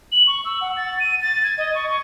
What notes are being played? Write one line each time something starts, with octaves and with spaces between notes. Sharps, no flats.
F#7
C#6
E6
F#5
A6
D#7
A6
G#6
D#5
C#6
C#6